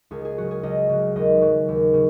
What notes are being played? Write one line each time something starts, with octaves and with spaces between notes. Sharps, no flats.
C#2 G#4
G#4
C#3 F#3 F#4
G#4
C#2 D#5
C#3 F#3
D#2 D#5
C#3 F#3
D#2
C#3